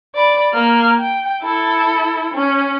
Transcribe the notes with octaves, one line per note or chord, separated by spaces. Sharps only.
D5 B5
A#3 F6
G5
E4 A4
C#4